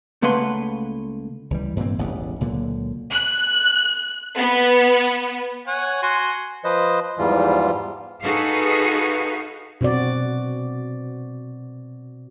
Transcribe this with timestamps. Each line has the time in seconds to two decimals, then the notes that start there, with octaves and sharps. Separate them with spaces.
0.22 C#2 A3 A#3 B4 F#5 C6
1.51 C#2 E3 G3
1.76 G2 A#2 E3 C4
1.98 E1 A1 C#3 B3
2.40 C#2 A#2 D3 F#3
3.12 F#6
4.37 B3
5.67 C#5 F#5 G#5
6.03 F#4 G#5 C6
6.64 F3 B4 C5 D#5
7.19 E2 G#2 E3 F3 G3 F4
8.23 D#4 F#4 G#4 A4 B4 F5
9.81 B2 C4 F#4 D5